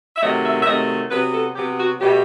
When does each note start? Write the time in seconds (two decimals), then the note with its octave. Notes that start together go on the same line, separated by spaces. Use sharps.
0.16 E5
0.21 C3 D#3 F#3 A3 D#5
0.43 E5
0.61 E5
0.65 C3 D#3 F#3 A3 D#5
1.10 C3 F#3 B3 B4
1.34 A4
1.55 C3 F#3 B3 G4
1.78 F#4
2.00 B2 F#3 A3 G4